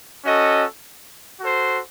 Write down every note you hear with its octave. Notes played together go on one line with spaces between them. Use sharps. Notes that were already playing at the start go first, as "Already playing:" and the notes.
C#4 F#4 A4 D#5
F#4 A4 C5